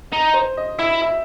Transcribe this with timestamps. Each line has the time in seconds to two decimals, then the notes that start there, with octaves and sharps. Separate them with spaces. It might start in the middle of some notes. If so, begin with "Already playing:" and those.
0.13 D#4
0.34 C5
0.57 D#5
0.79 E4 E5
1.02 E5